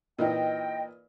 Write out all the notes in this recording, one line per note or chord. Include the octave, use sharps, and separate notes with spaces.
A#2 E3 D#4 D#5 G5